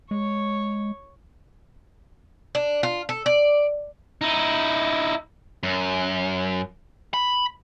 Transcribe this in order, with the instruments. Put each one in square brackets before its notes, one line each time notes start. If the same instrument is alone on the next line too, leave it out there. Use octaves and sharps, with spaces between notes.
[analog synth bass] G#3 [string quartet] C#5
[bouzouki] D4
F4
A4
D5
[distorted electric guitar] D#4 E4
[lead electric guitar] F#2
B5